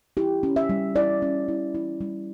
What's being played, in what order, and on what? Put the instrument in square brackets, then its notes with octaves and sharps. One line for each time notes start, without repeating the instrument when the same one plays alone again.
[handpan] E4 G4
C#4
E5
G3
E4 D5
C#4
E4
E4
G3